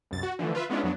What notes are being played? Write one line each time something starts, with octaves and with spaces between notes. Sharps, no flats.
C2 F#2 A6
F#4
D3 E3 F3 A3
F4 B4 E5
G#3 B3 C#4 D4 E4 F4
F2 F#3 B3 D4